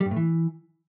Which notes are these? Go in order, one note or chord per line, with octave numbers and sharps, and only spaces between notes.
G3
G2
A2
E3